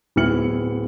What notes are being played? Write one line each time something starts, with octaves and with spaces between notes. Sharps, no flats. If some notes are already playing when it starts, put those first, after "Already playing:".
D1 B3 E4 F6 C#7 F#7